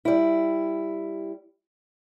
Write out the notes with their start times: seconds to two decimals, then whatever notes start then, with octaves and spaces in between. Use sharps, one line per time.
0.05 G3 E4